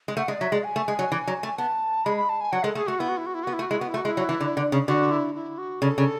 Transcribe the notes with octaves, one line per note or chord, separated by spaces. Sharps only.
G#3
A3 F#5
G#3 D5
F#3 E5
G#3 D5
G#5
A3
G#3
F#3
E3
F#3
A3
G#5
B3 A5
G#3 B5
B5
A5
G#5
F#3 F#5
G#3 A4
A3 G#4
A3 F#4
B3 E4
F#4
E4
F#4
E4
B3 F#4
E4
A3
F#4
G#3 E4
B3 F#4
E4
A3
F#4
G#3 E4
F#3
E3
D3
D3
C#3
D3 F#4
E4
E4
F#4
C#3 A4
C#3